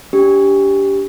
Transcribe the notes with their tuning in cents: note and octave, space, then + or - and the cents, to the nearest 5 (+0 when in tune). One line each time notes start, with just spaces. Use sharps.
D4 -35 G4 +0